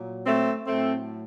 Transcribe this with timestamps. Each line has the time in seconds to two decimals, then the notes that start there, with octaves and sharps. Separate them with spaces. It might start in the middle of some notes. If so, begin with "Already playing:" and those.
Already playing: A#2 F#3
0.27 A3 C4
0.66 A2 F#3 A3 C4